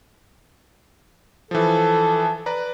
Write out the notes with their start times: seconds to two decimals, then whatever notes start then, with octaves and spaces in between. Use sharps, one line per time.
1.51 E3 F3 A4
2.46 B4 D5 A#5